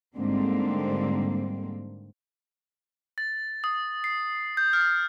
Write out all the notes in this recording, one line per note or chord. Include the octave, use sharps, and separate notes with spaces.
G#2 D3 G3 A#3 C4
A6
D#6
C7
G6
F6